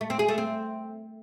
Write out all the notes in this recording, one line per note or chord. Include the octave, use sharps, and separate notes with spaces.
A3
C4
G#4
A3
C4